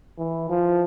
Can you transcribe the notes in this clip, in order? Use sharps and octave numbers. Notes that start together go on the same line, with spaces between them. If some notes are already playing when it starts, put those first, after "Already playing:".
E3
F3